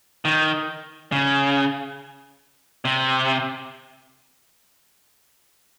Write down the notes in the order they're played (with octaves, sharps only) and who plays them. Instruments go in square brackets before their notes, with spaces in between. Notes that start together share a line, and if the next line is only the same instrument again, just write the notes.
[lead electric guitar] D#3
C#3
C3